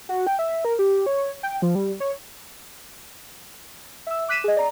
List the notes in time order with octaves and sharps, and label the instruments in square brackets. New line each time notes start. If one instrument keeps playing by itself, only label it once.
[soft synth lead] F#4
G5
E5
A#4
G4
C#5
G5
F3
G3
C#5
[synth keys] E5 E6
D6 F#6 B6 D#7 E7
G#4 D#5
D5 A#5